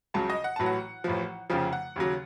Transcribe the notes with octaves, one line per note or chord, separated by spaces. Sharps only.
C#2 C#3 F#3 A5
D#5
F#5
A1 A2 F#3 A5
F#5
A1 A2 F3
F1 F2 C#3 F3
F#5
D#2 C#3 F#3